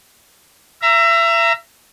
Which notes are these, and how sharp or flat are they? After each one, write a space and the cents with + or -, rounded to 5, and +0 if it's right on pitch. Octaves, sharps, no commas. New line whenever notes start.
E5 +30 A#5 +0